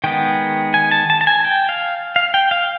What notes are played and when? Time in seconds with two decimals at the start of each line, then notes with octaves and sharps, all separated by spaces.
0.04 D#3 G#3 B3 G5
0.74 G#5
0.91 A5
1.10 A5
1.21 A5
1.27 G#5
1.45 G5
1.69 F5
2.16 F5
2.34 G5
2.51 F5